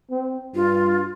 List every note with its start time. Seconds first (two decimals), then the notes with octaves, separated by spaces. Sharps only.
0.10 C4
0.55 G2 F4